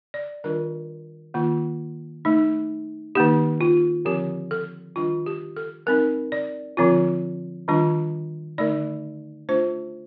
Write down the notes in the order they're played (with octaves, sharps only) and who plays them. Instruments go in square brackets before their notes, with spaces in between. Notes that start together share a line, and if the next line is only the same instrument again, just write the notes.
[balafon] D5
D#3 G3 D4 F4 A#4
D#3 A#3 F4
A3 D#4
D#3 A#3 D#4 G4
F4
D3 F3 C4 G4
A4
D#3 G3 D4 F4
G4
A4
G3 C4 D#4 A#4
D5
D3 F3 C4 F4
D#3 G3 D4 F4
D3 A3 D#4 D5
A3 D4 F4 C5